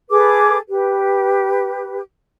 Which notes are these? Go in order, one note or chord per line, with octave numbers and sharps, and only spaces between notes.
G#4 A4 B4 D6
G4 B4